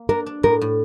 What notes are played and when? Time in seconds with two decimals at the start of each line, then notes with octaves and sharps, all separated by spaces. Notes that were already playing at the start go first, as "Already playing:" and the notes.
Already playing: A#3
0.09 D4 A#4
0.26 D4
0.43 A2 A#4
0.61 A2